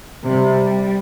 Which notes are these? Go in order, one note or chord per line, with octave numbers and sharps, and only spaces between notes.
C3 G3